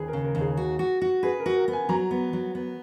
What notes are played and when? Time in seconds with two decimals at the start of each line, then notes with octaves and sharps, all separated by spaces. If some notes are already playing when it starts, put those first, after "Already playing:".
Already playing: D#2 G#4 B4
0.08 A#4
0.13 C#3
0.24 A#4
0.35 D#2
0.41 G#4
0.57 F#4
0.79 F#4
1.02 F#4
1.23 G#4 B4
1.40 A#4
1.46 F#4
1.57 A#4
1.68 B3
1.73 G#5
1.89 F#3 A#5
2.11 B3
2.33 F#3
2.55 B3